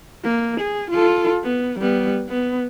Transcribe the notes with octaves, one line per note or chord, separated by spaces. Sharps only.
A#3
G#4
F4 A4
B3
G3 B3
B3